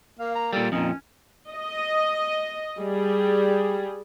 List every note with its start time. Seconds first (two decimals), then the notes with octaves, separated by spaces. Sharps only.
0.19 A#3 F5
0.35 A#5
0.53 A#2 G3 A4
0.72 F2 A#2 C#4 D#4
1.49 D#5
2.78 G3 G#4